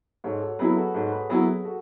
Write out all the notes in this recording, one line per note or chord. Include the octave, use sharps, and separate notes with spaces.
G#2 A4 C#5
F#4 A4
F#3 B3 E4 G#4 B4
F#4 A4
G#2 A4 C#5
G#4 B4
F#3 B3 E4 G#4
G#4
F#4 A4